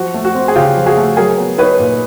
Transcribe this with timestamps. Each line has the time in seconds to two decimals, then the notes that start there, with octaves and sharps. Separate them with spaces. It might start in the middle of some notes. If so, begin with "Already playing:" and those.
Already playing: F3 F#4
0.14 A3
0.25 F#4
0.35 C4
0.48 G#4
0.56 C#3 F4 G4
0.76 F3
0.86 F#4 G#4
0.97 A3
1.17 F#3 G#4 A#4
1.38 B3
1.58 D#4 B4 C#5
1.79 A#2